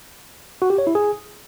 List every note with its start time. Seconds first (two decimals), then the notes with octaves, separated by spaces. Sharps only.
0.62 F#4
0.70 G4
0.78 C#5
0.87 E4
0.95 G#4